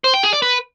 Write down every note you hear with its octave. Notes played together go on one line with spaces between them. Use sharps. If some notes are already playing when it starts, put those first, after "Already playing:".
C5
G5
G#4
D5
B4